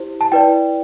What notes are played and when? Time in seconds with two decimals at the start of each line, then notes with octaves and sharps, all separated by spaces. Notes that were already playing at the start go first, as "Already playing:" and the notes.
Already playing: E4 G4 C5
0.21 A5
0.32 E4 B4 D5 G5